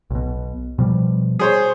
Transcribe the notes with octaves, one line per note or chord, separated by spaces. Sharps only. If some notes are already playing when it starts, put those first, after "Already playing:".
B1 B2
B2 F3 G3
G#4 C5 C#5